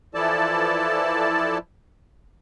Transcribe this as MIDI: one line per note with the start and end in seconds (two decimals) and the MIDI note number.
0.14 1.58 52
0.14 1.58 53
0.14 1.58 64
0.14 1.58 69
0.14 1.58 74
0.14 1.58 81